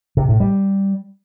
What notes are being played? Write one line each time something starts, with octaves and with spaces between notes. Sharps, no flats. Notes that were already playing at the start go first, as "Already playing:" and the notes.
C3
A2
G3